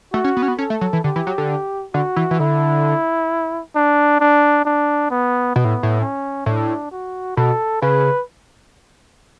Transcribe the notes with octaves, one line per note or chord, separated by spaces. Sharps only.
A3 F#4
C#4
B3
C#4
B3
C#4 A4
A3
F#3
E3
D3 G4
E3
F#3
D3
D3 F#4
E3
E3
D3 E4
D4
D4
D4
B3
B2 B3
A2
A2
C#4
A2 D4
F#4
B2 A4
C#3 B4